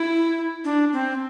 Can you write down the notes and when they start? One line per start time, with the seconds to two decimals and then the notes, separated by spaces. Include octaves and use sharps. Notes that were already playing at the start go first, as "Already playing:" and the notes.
Already playing: E4
0.65 D4
0.93 C4